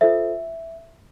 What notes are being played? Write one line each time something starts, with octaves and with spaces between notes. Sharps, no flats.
F4 A4 C5 E5